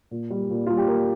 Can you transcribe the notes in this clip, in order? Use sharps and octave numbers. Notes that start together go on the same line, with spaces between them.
A#2
G3
A#2
G3 F4
G4
A#2 A#4